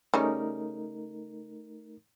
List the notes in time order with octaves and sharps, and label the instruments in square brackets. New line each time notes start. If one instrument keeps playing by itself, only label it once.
[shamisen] C#3 G3 C#4 [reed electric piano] A3 D#4 A#4